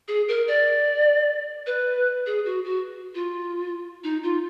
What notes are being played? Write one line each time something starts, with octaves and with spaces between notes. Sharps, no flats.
G#4
A#4
D5
B4
G#4
F#4
F#4
F4
D#4
F4